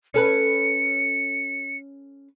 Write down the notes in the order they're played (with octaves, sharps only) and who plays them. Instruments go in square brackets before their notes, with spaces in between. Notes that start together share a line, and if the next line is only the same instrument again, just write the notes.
[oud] C#4 A4 B4 [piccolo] C#7